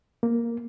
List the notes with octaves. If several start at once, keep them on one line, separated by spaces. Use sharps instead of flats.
A#3